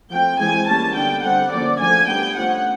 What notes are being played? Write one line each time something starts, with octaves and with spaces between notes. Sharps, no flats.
F3 A3 C4 G5
E3 G#3 C4 G#5
G3 A#3 C#4 A5
D3 G3 B3 D4 G5
D3 G3 C4 F#5
D3 F3 A#3 C#4 D5
D3 F3 A3 G#5
G3 B3 D4 G5
F3 A3 C#4 F#5